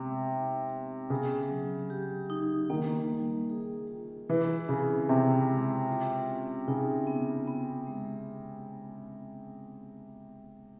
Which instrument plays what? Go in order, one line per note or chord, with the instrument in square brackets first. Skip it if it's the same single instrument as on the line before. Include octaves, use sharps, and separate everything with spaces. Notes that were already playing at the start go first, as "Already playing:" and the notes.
Already playing: [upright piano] C3 [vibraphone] G#3 B3
[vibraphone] D#4
B3
[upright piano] C#3 [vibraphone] B3
[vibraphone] F#3
G4
D#4
[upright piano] D#3 [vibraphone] A#3
[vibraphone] G3
G#4
F4
[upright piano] E3 [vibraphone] E4
[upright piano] C#3 [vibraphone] C4
[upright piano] C3 [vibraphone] C4
[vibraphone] G#3
F4
C#4
[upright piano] C#3 [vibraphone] D#4
[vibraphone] B3
B3
G#3